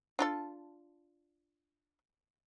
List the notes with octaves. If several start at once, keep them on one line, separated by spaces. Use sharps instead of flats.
D4 F4 A4